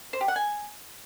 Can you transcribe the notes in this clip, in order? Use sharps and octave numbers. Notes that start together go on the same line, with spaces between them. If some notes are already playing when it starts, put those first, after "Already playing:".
C5
G4
F#5
G#5